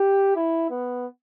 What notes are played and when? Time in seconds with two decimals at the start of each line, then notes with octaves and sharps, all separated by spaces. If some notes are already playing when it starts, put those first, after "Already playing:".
Already playing: G4
0.35 E4
0.70 B3